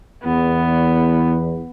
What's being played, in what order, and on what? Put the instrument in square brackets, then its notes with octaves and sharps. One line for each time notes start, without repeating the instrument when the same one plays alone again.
[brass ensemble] E2 [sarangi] B3